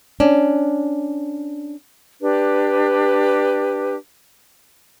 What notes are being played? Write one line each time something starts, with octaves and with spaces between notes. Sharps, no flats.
C#4 D4
D4 G4 B4